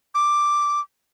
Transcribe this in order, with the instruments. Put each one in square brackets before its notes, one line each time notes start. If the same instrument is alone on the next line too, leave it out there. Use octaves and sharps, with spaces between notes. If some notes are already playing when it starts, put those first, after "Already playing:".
[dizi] D6